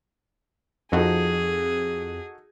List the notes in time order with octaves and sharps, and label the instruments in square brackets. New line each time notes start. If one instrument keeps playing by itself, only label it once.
[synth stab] F2 [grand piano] D#4 F#4 A4 [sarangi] G#4